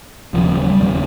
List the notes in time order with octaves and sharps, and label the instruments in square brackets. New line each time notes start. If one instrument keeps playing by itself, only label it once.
[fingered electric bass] E1 D#2 C#3 F3
F#3
G3
E1 D#2 C#3 F#3